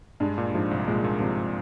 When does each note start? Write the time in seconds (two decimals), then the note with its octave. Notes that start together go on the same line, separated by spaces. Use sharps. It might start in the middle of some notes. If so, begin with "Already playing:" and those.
0.20 G2 G#3
0.38 A#2
0.54 G#2 F3
0.71 C2
0.87 A#2 G#3
1.04 A#2
1.20 C3 F3